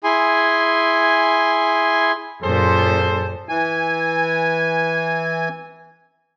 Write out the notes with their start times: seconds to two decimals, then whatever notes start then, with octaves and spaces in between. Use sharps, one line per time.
0.04 E4 G#4 G#5 C6
2.42 F#2 A#2 G#4 A4 C5
3.49 E3 G#5